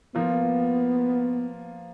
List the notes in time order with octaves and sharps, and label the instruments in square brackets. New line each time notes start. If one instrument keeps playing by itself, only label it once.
[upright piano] F3 A#3 F4 [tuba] B3